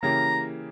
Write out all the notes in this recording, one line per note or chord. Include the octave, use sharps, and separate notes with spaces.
C#3 E3 A#3 E4 G4 A#5